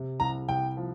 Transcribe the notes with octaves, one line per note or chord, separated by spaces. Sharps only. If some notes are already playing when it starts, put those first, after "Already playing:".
Already playing: C3
C2 A#5
C2 G5
F3